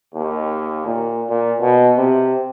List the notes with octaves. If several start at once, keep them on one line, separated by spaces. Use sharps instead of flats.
D#2
A#2
A#2
B2
C3